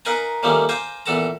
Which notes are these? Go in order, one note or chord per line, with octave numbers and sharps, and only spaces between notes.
D#4 A#4 B4 F5 G#5 A#5
D#3 F3 G3 A3 A#3 C#4
C5 F5 G5 G#5 A#5 D6
A#1 E3 B3 A4 A5 A#5